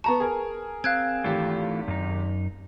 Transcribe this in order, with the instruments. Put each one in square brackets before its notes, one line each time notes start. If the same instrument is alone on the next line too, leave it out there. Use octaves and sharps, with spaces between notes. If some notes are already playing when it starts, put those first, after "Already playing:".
[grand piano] B3 A#5 C#6 [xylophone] A5
[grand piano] G#4 A#4
[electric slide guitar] C4 [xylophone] F5 F#6 G#6
[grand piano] G#1 G4 [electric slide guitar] E3 A3 F4
[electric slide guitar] F#2 D#4